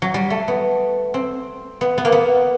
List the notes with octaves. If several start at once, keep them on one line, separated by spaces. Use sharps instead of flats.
F#3
G3
A3
B3
C4
B3
B3
A#3
B3